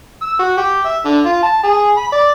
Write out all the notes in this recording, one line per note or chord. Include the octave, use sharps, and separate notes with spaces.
E6
F#4
G4
E5
D3
F4
A5
G#4
B5
D5